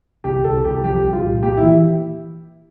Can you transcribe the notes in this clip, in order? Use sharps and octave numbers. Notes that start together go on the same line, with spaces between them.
C2 G4
C2 A4
C2 G4
F3 G4
C2
F4
A#2
A#3 G4
E3 E4